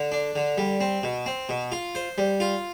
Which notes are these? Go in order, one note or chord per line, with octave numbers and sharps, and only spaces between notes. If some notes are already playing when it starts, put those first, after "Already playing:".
Already playing: D3
D4
D3
G3
C4
B2
C4
B2
F4
C5
G3
F4